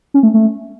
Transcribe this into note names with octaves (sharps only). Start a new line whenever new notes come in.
C#4
A3
A3